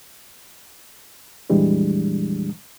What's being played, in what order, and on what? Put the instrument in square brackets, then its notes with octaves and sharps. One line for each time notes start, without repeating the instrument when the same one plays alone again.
[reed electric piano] F2 A#2 E3 G3 G#3 D4